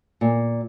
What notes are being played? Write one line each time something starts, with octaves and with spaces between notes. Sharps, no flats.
A#2